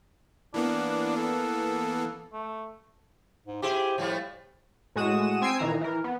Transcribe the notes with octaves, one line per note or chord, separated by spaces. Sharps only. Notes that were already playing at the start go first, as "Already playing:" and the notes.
E3 A#3 B3 D4
A4
A3
G#2
E4 G4 G#4 C5
A2 F3 G3 A3
A2 G#3 F#4 D#6 E7
C4 G#5 E6 G#6 C7 D7
A#2 D#3 E3 A#5
E3 A#4
B3